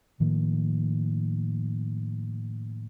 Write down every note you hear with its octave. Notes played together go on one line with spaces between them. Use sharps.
A2 D#3 F3 A#3